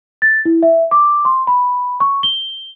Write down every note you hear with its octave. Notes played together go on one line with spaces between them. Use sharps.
A6
E4
E5
D6
C6
B5
C#6
G7